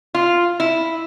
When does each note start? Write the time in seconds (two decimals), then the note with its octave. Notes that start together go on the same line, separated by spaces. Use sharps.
0.15 F4
0.60 E4